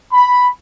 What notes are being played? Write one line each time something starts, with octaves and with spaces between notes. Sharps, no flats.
B5